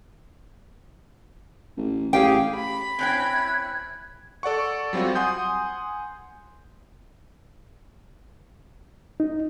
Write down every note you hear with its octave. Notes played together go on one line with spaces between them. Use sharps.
A1
A1 G4 G#4 F5 G5
B5
C4 C#4 E4 G5 F#6 G#6
A4 D5 F#5 C#6
F#3 G3 C4 F4 F#4
F#5 G#5 C6 D#6 G6
D#4